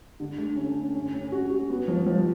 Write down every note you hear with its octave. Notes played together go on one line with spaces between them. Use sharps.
D3
A3
C#4
C#4
C#4
C#4
F#4
F#4
B3
F3
F3